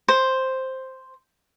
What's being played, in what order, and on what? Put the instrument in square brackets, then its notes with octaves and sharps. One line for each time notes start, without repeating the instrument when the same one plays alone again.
[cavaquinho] C5